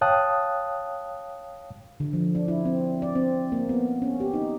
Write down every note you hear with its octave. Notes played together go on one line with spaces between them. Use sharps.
C#5 F5 G5 A5 D#6 F#6
D3
F3
D4
E4
C4
D5
C4
A#3
B3
C#4
G4
D#4